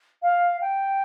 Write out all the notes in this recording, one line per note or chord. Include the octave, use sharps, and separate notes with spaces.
F5
G5